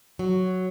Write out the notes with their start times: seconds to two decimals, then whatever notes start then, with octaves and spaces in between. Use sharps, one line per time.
0.19 F#3